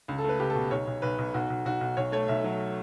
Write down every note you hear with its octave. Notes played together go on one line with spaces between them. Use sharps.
C#2
A4
A3 B4
C#2 G4
A4
B2
B1 C#5
B1
B1 B4
B1
B1 F#4
B1
B1 F#4
B1
B1 C#5
A3 C#5
B1 E5
F#3